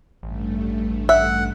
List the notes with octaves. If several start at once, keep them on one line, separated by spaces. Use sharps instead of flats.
A1 G2 A3
E5 F#5